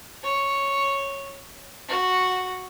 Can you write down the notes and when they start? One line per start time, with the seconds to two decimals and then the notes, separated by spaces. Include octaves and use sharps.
0.23 C#5
1.88 F#4